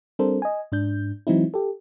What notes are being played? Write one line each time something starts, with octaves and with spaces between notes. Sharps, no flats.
G3 C4 D4 A4 A#4 C5
D#5 G#5
G#2 D4 G6
E3 F#3 G#3 C4 D#4 E4
G4 A4